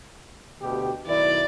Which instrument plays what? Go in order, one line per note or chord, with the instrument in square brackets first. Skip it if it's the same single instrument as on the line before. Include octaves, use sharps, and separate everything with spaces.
[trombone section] D2 B2 G4
[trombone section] B1 D#3 E4 [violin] D5